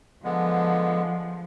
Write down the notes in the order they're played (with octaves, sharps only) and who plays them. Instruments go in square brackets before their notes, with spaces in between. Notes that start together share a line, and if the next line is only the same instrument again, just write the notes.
[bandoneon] D3 G#3 B3 [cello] F3